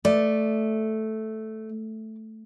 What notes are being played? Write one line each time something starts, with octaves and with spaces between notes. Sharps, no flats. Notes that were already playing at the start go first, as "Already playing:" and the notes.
A3 D5